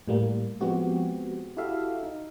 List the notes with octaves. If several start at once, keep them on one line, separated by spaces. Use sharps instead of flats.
A2 G3 A#3
F3 G#3 B3 C4 F#4 G4
E4 F#4 G4 A4 E5 F5
D#4